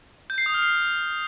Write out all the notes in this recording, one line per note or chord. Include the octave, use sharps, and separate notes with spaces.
G6
C7
D#6
F6
C7